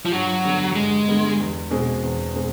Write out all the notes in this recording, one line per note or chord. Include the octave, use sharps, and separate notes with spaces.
F3
G2 F#3
D3 G3 B3
G2 G#3
D3 G3 B3
E2
B2 G#3 C4
E2
B2 G#3 C4